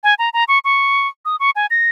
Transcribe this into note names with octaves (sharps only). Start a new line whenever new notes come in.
G#5
A#5
A#5
C#6
C#6
D#6
C#6
G#5
A#6